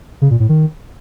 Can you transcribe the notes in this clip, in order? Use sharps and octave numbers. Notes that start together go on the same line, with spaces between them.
C#3
A#2
A2
D#3